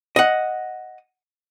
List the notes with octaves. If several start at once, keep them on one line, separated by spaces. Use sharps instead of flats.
D#5 F#5